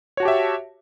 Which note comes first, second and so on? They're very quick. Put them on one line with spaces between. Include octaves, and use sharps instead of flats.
C#5 F#4 A5 G4 E5